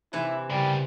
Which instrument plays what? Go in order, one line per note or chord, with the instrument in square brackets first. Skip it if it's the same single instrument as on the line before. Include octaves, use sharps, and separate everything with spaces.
[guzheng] C3 E3 [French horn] E4
[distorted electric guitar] C#3 A#4 [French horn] G3